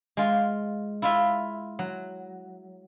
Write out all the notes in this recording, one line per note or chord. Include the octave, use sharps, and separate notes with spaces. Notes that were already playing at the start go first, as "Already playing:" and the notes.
G#3 F4
E4 F4 E5
F#3